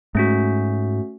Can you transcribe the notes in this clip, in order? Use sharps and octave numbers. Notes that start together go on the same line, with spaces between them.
G#2 A3 C#4 F#4